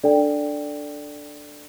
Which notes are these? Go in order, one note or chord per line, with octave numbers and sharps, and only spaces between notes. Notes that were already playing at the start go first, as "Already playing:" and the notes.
D4 A4 D5 G5